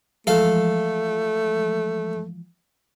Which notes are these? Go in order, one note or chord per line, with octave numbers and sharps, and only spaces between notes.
E3 F3 G#3 A3 A4 F5